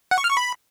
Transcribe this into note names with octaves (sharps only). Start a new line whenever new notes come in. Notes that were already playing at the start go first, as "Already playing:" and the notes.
F#5
C#6
F6
C#6
B5